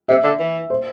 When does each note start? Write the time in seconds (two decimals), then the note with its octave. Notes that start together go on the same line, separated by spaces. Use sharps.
0.08 C3 E5
0.24 D3
0.39 E3
0.70 C5